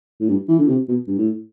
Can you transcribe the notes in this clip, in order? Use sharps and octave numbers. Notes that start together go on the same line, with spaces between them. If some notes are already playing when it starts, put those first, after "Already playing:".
A2
G2
E3
D3
C3
B2
G2
A2